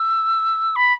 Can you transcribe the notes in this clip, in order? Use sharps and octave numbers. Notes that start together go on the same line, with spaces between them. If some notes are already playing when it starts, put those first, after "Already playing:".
Already playing: E6
B5